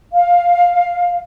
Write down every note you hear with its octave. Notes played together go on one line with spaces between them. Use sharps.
F5